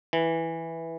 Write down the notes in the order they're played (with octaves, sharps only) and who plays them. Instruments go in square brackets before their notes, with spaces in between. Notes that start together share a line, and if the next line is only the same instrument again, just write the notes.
[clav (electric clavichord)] E3